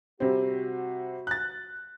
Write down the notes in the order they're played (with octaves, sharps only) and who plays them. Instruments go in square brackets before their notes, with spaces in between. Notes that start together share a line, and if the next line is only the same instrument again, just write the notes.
[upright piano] C3 G3 C4 [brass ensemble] F#4
[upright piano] F#6 A6